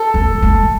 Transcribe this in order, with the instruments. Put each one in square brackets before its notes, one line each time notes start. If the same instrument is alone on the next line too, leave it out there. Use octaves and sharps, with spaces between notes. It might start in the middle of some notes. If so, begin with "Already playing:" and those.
Already playing: [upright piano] A4
[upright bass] A#3
A3